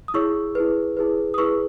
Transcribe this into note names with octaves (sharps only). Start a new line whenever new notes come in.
D#6
E4 G#4 C#5 C#6 E6
E4 G#4 B4
E4 G#4 B4
D#6
E4 G#4 B4 C#6 E6